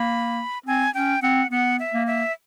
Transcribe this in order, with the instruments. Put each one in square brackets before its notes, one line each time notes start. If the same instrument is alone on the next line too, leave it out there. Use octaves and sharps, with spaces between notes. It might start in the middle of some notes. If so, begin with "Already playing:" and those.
Already playing: [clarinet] A#3 [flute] B5
[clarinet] C4 [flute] G#5
[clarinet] C#4 [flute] G5
[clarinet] C4 [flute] F#5
[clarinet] B3 [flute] F#5
[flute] E5
[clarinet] A#3
[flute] E5